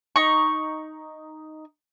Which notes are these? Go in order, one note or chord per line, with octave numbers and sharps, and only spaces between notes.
D#4 C#6